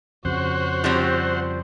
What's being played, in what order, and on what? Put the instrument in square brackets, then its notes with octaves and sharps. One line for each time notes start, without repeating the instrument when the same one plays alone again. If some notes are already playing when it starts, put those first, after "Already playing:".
[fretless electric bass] F2 C#3 [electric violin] F#4 C#5 [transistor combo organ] C5 F#5
[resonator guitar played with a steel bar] F3 G3 C4